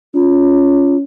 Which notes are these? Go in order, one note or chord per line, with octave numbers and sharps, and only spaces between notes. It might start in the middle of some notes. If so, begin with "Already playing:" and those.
C#4 F4